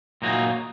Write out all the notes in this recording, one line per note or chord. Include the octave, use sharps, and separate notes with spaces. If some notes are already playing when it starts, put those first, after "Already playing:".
A#2 F#3 A#3 D#4 F#4